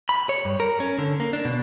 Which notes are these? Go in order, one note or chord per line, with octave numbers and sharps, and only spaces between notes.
B5
C#5
G2
A#4
C#4
D3
A#3
D4
B2